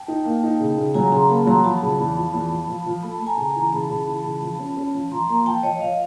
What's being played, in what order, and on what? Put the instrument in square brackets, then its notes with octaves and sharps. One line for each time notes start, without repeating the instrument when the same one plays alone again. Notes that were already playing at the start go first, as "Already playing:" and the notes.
Already playing: [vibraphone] G5 A5
[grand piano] D#4
A#3
D#4
C#3
C#3
[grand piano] F#3 [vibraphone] G#5 A#5
[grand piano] C#3 [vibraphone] A#5 C6
[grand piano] A#3 [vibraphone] A5 B5
[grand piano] F#3 [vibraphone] A#5 C6
[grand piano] F3 [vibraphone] A5 B5
[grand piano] C#3
E2
F3
E2
F3
F3
F3
[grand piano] A3 [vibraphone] A5 B5
[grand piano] A3 [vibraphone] A5
[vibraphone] G#5 A#5
[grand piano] C#3
[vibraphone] G#5 A#5
[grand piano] E3
[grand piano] C#3 [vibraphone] A5 B5
[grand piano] C#3
E3
C#3
F3
C#4
C#4
F3
[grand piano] F3 [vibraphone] A#5 C6
[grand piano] A#3 [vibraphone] A#5 C6
[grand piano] F3 [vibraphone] G5 A5
[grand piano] F3 [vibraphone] C#5 D#5
[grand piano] F3 [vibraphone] D#5 F5